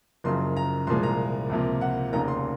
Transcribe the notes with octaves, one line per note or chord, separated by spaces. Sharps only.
F#1 F#2 C#3 F3 C6
A#5
C2 A#2 F3 G#3 C6
A#5
C#2 C3 F3 A#3
F#5
F1 D#2 C#3 A#5
C6